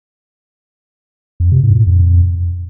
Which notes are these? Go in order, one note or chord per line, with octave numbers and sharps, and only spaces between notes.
F2
C3
G#2
A#2
F2